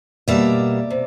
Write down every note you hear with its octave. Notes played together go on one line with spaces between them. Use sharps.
B2 G3 A#3 D5 E5
C3